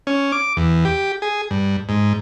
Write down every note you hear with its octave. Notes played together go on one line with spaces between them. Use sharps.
C#4
D6
E2
G4
G#4
G2
G#2